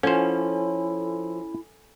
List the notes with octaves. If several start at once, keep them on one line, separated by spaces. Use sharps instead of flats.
F3 C#4 E4 A4 C5 C#5 G#5